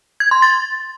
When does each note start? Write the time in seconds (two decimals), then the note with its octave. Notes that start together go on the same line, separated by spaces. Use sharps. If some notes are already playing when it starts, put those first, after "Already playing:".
0.20 G#6
0.31 C6
0.42 A6